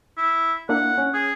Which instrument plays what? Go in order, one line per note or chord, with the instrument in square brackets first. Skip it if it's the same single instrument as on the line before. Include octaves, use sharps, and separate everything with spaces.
[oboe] E4
[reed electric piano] A#3 D4 E4 [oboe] F#5
[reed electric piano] C#4
[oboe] G#4